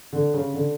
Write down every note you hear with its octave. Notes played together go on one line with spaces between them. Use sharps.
D3
C#3
D3